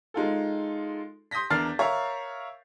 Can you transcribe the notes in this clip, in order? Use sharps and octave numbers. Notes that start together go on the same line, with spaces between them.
G#3 D#4 F4 A4
C6 D#6 G6 A#6 B6
E2 D4 A#4 F6 A6 C7
A#4 C#5 E5 F5 A#5